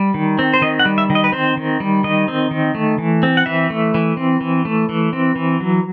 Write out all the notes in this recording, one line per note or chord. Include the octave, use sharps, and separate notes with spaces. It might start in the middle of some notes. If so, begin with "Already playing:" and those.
Already playing: G3
D#3
C4
C5
D#3 D#5
F#5
G3
E5
D#3
D#5
B4
C4 C5
D#3
G3
D#3 D#5
C4
D#3
A3
E3
C4
F#5
E3 E5
A3
E3
C4
E3
A3
E3
C4
E3
F#3